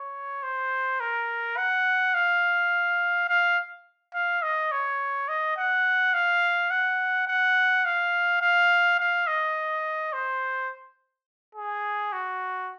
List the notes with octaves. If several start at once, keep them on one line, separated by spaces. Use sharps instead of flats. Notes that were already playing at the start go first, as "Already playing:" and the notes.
Already playing: C#5
C5
A#4
F#5
F5
F5
F5
D#5
C#5
D#5
F#5
F5
F#5
F#5
F5
F5
F5
D#5
C5
G#4
F#4